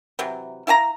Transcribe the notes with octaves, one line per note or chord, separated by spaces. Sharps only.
C3 E3 F#3
E4 F5 G#5 A#5